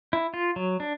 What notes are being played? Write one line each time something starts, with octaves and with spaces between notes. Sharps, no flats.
E4
F4
F#3
D4